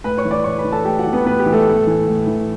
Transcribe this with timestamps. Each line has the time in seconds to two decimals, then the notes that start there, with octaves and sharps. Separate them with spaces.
0.04 A2 B4 B5
0.18 C#5 C#6
0.25 E3
0.31 D5 D6
0.44 A2 C#5 C#6
0.58 B4 B5
0.65 E3
0.72 A4 A5
0.85 A2 G4 G5
0.99 F#4 F#5
1.06 E3
1.13 B3 B4
1.26 A2 B3 B4
1.39 G4
1.46 E3
1.53 A3 A4
1.67 A2
1.87 E3
2.08 A2
2.27 E3